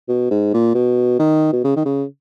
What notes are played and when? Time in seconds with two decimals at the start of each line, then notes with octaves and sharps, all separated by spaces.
0.09 B2
0.31 G#2
0.54 A#2
0.75 B2
1.19 D#3
1.53 B2
1.64 C#3
1.76 D#3
1.85 C#3